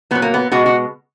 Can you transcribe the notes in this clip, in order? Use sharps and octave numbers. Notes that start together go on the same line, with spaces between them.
A#2 F#3 B3
A#3
B3
B2 G#3 F#4
F#4